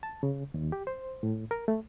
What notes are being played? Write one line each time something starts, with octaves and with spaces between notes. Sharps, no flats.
A5
C#3
D#2
G4
C5
A2
A#4
A3